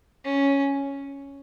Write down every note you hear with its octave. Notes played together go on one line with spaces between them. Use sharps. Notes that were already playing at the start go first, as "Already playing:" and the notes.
C#4